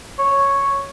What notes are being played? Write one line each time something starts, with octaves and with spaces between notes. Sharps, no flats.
C#5